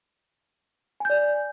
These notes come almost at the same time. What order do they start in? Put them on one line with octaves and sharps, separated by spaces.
G#5 G6 D5